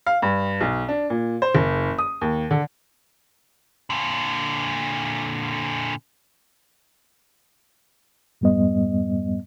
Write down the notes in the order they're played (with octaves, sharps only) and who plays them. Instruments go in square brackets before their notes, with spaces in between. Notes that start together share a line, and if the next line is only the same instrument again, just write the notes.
[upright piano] F5
G2
B1
D4
A#2
C5
F#1
D#6
D#2
D3
[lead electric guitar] A#2 D3
[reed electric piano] F2 G#2 G3 B3 D#5